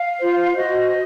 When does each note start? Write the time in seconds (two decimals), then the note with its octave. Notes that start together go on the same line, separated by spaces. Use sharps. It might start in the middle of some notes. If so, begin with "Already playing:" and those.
Already playing: F5
0.19 F4 C5
0.55 F#4 C5 D#5